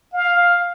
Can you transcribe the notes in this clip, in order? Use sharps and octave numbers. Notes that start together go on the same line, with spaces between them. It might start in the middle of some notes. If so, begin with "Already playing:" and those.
F5